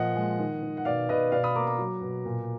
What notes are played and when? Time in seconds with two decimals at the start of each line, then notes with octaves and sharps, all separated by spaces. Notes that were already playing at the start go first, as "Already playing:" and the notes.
Already playing: A#2 F3 D#5 F#5
0.16 G#3
0.39 D#3
0.63 D#3
0.77 F#5
0.85 B2 D5 F5
1.09 B2 B4 D#5
1.32 B2 D5 F5
1.44 B5 D#6
1.56 A#3 A#5 D6
1.67 A#5 D6
1.79 F#3
2.01 B2
2.25 A#2